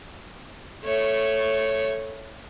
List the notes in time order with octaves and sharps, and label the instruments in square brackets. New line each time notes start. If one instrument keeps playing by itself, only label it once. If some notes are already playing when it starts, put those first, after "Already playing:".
[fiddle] A3 C#5